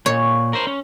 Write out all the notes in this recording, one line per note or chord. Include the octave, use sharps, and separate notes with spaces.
A#2 C#5
A#4 C5
C#4